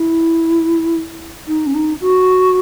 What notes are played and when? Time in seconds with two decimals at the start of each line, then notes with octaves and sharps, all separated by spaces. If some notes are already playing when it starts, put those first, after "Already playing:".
Already playing: E4
1.48 D#4
1.66 C#4
1.74 D#4
2.01 F#4